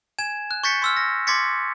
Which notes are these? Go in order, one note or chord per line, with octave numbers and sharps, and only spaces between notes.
G#5 G#6 E7
F#6
C#6 G6 A6 B6 C#7
C6 E6 F6
A#6
C6 D6 G#6 A6 B6 C#7